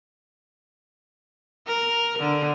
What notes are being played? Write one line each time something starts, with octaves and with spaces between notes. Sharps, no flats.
A#4
D3